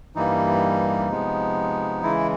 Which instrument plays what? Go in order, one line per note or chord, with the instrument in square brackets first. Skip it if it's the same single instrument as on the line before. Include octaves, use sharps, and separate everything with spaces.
[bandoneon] G2 E3 G3 A#3 D#4
C3 F3 G#3 B3
C#3 E3 G#3 E4